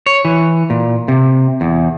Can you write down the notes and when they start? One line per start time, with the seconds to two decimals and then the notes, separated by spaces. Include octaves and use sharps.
0.06 C#5
0.25 E3
0.70 A#2
1.08 C3
1.61 E2